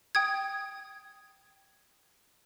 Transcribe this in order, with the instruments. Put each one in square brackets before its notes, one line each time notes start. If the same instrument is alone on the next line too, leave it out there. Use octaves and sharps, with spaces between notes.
[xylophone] G5 D#6 G#6